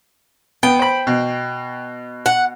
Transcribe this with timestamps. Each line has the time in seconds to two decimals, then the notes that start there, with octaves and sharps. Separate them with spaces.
0.63 B3 G5
0.79 C5 B5
1.07 B2
2.26 F#5